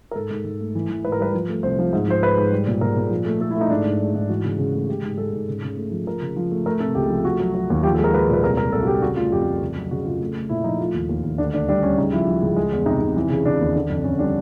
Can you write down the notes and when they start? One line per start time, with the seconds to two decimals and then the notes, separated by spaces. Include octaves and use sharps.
0.11 A#4
0.15 G#2 A4
0.30 G#2
0.45 G#2
0.60 A3
0.75 E3
0.89 E3
1.04 G#2 B4
1.12 A#4
1.19 G3 B4
1.34 F3
1.49 A3
1.63 C2 C5
1.79 F3
1.93 G#2
2.08 F3 C5
2.22 G#2 B4
2.37 G#2
2.51 G3
2.67 A#2
2.81 A#2 A#4
2.96 A#2
3.11 F3
3.25 A3
3.41 A3 A4
3.51 E4
3.56 A3 D#4
3.70 G#2 D4
3.85 G#2
4.00 G#3
4.15 G#2
4.29 E3 F#4
4.45 C#3
4.58 C#3
4.74 A3
4.89 G#3 G4
5.03 G#2
5.18 G#3 A4
5.32 G#2
5.48 C#3
5.63 C#3
5.77 A3
5.91 F3
6.06 F3 A#4
6.22 C#3
6.36 F3
6.51 A3
6.66 A3 A#4
6.80 C3 A4
6.95 C#2 G4
7.10 F3
7.25 A3 F#4
7.40 F#3
7.54 F#3
7.70 D#2
7.83 F3 G4
7.94 A4
7.99 G#3
8.04 A#4
8.13 G#3 B4
8.29 A#2 B4
8.44 C2 A#4
8.57 C2 A#4
8.72 C2 A4
8.83 F#4
8.87 G3 G4
9.02 C#3 F#4
9.16 A3 F4
9.32 F2 G4
9.46 A3
9.62 C#3
9.76 F#3
9.91 C#3 F#4
10.06 C#3 F4
10.20 A3
10.36 A3
10.49 A#2 E4
10.64 F3 D#4
10.80 A3 F4
10.94 D#2
11.09 D#2
11.23 D#2
11.38 D2 D4
11.53 D2 D4
11.69 G3 D4
11.83 G3 C#4
11.98 C#3 D#4
12.12 F3 E4
12.28 F3
12.42 C#2
12.56 G#3
12.72 E2
12.86 C3 D#4
13.01 C3
13.16 E3
13.30 C#3
13.45 C#3 D4
13.60 D#2
13.76 D3
13.90 F2
14.04 F2 C#4
14.19 G3 D4